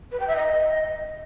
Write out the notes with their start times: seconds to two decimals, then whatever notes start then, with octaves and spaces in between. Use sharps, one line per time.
0.12 B4
0.20 G5
0.28 E5
0.36 D#5